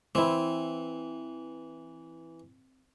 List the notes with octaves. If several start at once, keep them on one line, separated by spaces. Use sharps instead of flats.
E3 C4 E4